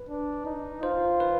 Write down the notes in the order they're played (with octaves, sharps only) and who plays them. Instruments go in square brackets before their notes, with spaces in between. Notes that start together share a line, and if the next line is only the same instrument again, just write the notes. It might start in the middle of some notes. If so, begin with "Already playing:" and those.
Already playing: [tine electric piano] B4
[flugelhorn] D4
D#4
[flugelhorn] F4 [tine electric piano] C5
[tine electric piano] B4